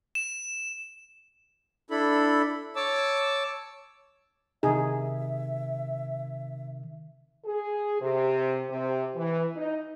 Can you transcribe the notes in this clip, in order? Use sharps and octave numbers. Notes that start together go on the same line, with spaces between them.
E7
D4 E4 A4 B5
C#5 A5 D6 E6
C3 D#3 D#4 G#4 E5
G#4
C3
C3
E3
D#4